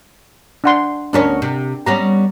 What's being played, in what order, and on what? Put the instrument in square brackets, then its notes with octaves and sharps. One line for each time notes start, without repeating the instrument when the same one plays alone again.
[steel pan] D4 F#5 C6
[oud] D2 B3 C#4 [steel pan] D4 A#4
[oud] C3
[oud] G3 B3 C#4 [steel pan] A#5